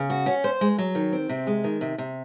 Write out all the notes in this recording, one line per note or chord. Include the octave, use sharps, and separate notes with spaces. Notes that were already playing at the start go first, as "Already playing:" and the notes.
Already playing: C#3
F#4
C#4
C5
G#3
F#3
D#3
C4
C3
G#3
D#3
C3
C3